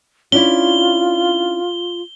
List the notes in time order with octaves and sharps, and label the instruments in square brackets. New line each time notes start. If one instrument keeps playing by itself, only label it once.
[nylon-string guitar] C#4 D4 E4 [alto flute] F4 [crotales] G7